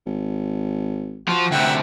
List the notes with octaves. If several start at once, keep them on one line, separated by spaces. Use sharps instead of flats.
G#1
F3 F4 F#4
D2 C3 E5 F#5 G5